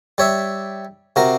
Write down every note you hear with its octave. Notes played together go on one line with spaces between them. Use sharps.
G3 C#5 E5
C3 F#4 A#4